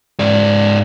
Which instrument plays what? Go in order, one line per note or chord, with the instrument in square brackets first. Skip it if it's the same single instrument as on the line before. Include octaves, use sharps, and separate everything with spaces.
[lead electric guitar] G#2 D5